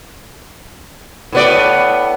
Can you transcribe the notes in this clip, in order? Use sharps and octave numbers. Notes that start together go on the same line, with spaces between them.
A2 B3 D5